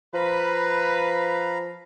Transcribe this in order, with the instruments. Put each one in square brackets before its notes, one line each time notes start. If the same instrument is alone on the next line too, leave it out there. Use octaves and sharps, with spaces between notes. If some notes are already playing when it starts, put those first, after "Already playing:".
[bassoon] F3 [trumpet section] B4 [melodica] F5 A#5 B5